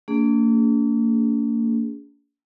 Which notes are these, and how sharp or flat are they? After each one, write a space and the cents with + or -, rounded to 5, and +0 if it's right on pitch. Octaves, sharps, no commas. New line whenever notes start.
A#3 -40 D4 -40 G#4 +0